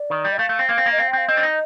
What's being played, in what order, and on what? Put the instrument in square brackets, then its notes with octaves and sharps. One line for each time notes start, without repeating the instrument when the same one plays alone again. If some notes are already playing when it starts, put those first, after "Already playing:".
Already playing: [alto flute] D5
[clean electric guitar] D#3
G3
[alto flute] D#5
[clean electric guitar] A3 [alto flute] F5
[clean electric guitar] A3
C4
[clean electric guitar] A#3 [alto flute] F5
[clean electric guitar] C4
A#3
[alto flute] D#5
[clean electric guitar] C4 [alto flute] F5
[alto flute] G5
[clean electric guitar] C4 [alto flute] F5
[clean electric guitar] C4 [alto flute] D#5
[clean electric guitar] D4
D#4